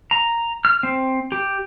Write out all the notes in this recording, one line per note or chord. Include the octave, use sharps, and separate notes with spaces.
A#5
F6
C4
G4